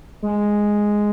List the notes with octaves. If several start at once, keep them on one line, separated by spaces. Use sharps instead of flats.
G#3